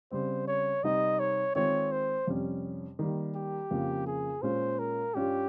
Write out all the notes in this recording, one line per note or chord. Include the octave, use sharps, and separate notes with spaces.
C#3 G3 C4 C5
C#5
C3 G3 C4 D#4 D#5
C#5
D#3 G#3 C4 F4 C#5
C5
F2 C3 G3 C#4
D#3 G3 A#3
G4
F2 C#3 F3 A#3
G#4
A#2 G#3 C#4 C5
A#4
G2 G3 C#4 F4 G4